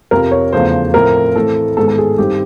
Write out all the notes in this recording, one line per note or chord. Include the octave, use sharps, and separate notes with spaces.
F2 C3 F3 A#4
C#5
E2 C#3 F3 A3 C5
A2 F3 A3 C4 A#4
A2 E3 A3 C4 A4
G#2 D#3 G#3 B3 A4
A4
G#4
G2 D#3 G3 C4 G4